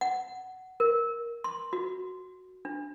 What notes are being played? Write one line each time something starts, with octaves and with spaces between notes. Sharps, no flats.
F#5
A#4
C6
F#4
D4